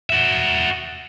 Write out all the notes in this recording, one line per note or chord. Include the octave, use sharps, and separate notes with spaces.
F#4 E5